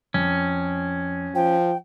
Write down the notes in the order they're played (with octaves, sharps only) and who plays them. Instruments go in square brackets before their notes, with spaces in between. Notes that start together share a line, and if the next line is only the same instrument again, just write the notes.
[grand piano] F2 [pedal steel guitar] C#4
[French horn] F3 [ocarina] G5